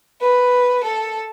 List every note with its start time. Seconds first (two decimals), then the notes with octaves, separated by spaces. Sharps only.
0.21 B4
0.84 A4